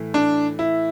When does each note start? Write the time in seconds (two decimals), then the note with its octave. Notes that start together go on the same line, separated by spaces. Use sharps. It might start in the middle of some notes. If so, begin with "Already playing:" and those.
Already playing: A2 E3 A3
0.14 D4
0.59 E4